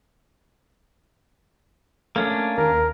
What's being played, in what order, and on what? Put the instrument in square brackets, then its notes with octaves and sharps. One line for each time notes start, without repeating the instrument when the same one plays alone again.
[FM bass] A3 [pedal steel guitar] A#3 C#4 D4
[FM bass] D#2 [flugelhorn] A#4